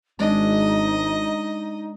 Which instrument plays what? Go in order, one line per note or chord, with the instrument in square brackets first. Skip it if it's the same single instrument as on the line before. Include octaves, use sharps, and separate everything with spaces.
[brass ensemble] G#1 [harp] G#3 D4 [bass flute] D#4 [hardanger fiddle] D#5